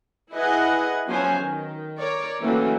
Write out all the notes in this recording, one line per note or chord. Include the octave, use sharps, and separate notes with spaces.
E4 G#4 B4 D#5 F#5 G#5
F3 F#3 B3 C#4 C5 G#5
D#3
A#4 C#5 D5
E3 F#3 A3 A#3 C4 C#4